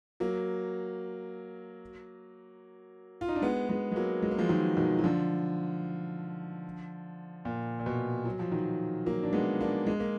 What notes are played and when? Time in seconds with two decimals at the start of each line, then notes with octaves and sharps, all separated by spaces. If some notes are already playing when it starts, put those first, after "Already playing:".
0.20 F#3 A#3
3.21 F4
3.28 D#4
3.36 D4
3.42 G#3 B3
3.69 G#3 B3
3.92 G#3
3.96 F#3 A#3
4.22 G#3
4.31 A#3
4.39 F3 G#3
4.49 D#3 F#3
4.77 B2 D#3
4.99 F#3
5.04 D3 F3
7.45 A#2
7.80 A#2
7.86 B2
8.25 F#3
8.39 F3
8.52 D#3 F#3
9.06 F#3 A#3
9.23 D4
9.33 G#3 B3
9.60 A#3 D4
9.87 G#3
10.00 A#3